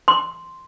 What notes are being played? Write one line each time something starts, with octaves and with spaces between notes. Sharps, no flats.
C6